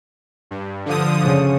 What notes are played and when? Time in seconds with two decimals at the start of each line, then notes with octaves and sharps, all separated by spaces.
0.51 G2
0.86 D3 F3 D#6
1.25 C#3